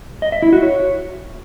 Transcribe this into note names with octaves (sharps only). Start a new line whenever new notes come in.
D#5
E5
E4
F#4
C#5